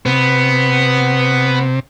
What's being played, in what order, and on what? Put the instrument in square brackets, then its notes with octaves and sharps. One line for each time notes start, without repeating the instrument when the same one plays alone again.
[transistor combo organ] C3 [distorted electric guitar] B3